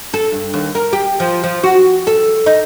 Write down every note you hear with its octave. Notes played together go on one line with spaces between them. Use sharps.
A4
G2
D#2
A#4
G4
F3
F3
F#4
A4
D#4